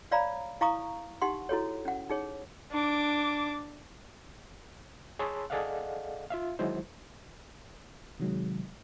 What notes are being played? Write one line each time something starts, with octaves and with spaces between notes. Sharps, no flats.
C#5 D5 F5 A#5 B5
E4 F5 A#5 C#6 D#6
D#4 G4 F#5 C6
E4 F#4 A4 C#5
C#4 F#5
D#4 G#4 C#5
D4 D6
G#4 C#5 A5 B5 C6 E6
G#4 A4 D5 D#5 F5 F#5
F4 E5 F5
D#3 F#3 G#3 E4 C5
C3 D#3 F#3 G#3